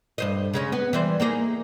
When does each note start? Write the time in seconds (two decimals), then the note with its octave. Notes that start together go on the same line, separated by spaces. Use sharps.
0.18 G2 C5 D#5
0.54 C#3 G#3 C#4
0.72 B3
0.93 E3 G3 C5
1.20 A#3 D#4 G#4